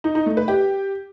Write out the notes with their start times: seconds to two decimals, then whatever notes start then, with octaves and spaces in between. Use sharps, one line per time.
0.04 D#4
0.15 D#4
0.26 A3
0.37 B4
0.48 G4